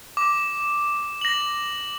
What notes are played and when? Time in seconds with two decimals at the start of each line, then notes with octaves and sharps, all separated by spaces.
0.17 D6
1.21 A#6 F#7